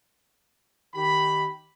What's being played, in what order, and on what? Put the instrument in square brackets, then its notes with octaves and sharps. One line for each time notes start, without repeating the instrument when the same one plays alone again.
[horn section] D#3 G4 B5